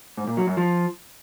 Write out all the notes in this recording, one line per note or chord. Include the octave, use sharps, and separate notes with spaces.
G#2
A#2
F#3
F#2
F3